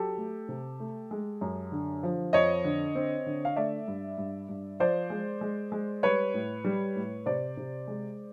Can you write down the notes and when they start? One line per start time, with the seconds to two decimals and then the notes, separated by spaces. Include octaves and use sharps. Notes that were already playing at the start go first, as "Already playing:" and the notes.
Already playing: F#3 G4 A4
0.18 A3
0.48 C3
0.80 A3
1.11 G#3
1.41 F#2
1.72 D3
2.03 F3
2.33 F2 C#5 D#5
2.64 D3
2.95 C4
3.26 D3
3.45 F5
3.56 A3 D5 E5
3.88 G2
4.18 G2
4.49 G2
4.80 F3 C5 D5
5.10 G#3
5.41 G#3
5.72 G#3
6.03 G3 B4 C#5
6.34 A2
6.64 G3
6.96 A2
7.26 C3 C5 D5
7.57 C3
7.88 G#3